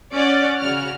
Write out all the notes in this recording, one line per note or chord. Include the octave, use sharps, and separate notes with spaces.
C#4 D5 F#5
C#3 F#4 F6